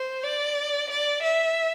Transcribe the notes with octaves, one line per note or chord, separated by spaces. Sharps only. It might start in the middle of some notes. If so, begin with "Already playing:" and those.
Already playing: C5
D5
D5
E5